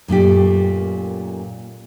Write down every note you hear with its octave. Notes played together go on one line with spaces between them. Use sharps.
F#2 A#2 A3 G4